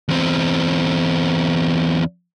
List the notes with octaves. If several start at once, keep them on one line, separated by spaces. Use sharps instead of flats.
E2 C4